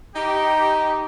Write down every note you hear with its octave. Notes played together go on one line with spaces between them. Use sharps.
D#4 G4